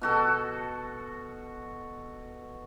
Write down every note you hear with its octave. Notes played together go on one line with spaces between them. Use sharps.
B2 F#4 A4